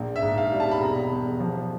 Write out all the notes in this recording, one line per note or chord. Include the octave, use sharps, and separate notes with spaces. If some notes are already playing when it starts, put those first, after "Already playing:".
Already playing: A#1 A#3
E5
G#2
F5
G3
A5
B5
E1 A#5
E2
F3